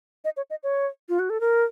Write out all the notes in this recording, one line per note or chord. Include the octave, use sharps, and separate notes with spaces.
D#5
C#5
D#5
C#5
F4
F#4
A4
A#4